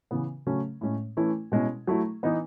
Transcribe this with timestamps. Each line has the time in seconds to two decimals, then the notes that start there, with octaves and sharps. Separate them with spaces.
0.11 C#3 E3 B3
0.47 C#3 F#3 A3 C#4
0.81 A2 G#3 C#4
1.17 E3 A3 C#4 E4
1.52 B2 G#3 C#4 E4
1.87 F#3 A3 E4
2.23 E3 B3 D#4